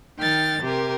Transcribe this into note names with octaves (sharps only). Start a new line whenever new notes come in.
D#3 G5 F6 A6
C3 G4 A#4